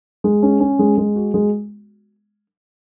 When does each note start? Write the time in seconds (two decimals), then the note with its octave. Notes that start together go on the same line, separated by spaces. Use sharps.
0.24 G#3
0.43 C#4
0.60 C#4
0.79 G#3
0.98 G#3
1.16 F#4
1.34 G#3